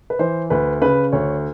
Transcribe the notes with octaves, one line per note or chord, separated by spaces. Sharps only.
B4
E3 C5
D2 B4
C#3 B4
D2 C#5